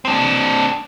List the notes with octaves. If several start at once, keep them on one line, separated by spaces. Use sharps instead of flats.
C4 D4